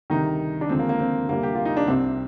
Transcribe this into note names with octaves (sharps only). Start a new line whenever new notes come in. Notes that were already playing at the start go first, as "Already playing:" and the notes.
D2 C3 D#3 G3 D#4
D4
D#2 D3 F3 G#3 C4
A#3
A#3
C4
D2 C3 G3 A#3
G4
F4
D#4
D4
C2 C3 G3 C4